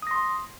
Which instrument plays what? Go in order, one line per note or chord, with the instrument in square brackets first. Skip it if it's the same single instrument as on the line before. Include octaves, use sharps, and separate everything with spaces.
[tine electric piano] D#6
A#6
C6